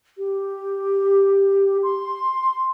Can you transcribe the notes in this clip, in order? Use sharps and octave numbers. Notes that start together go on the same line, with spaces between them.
G4
C6